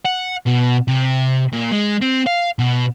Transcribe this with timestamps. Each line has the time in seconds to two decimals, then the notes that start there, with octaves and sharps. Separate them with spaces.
0.05 F#5
0.46 B2
0.88 C3
1.53 A#2
1.71 G#3
2.02 C4
2.27 F5
2.59 B2